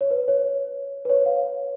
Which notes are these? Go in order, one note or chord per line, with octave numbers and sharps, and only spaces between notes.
C#5
B4
C#5
B4
C#5
F5